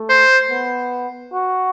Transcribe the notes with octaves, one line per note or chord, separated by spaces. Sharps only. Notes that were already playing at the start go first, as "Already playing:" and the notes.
Already playing: A3
C5
B3
F#4